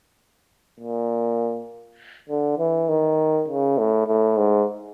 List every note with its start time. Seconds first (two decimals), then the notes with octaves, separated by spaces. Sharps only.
0.80 A#2
2.29 D3
2.59 E3
2.89 D#3
3.48 C#3
3.78 A2
4.07 A2
4.37 G#2